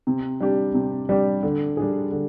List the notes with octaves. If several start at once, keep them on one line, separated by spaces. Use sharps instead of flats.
C3
G3 D4 G4
C3
G3 D4 G4
D3
G3 D4 G#4
D3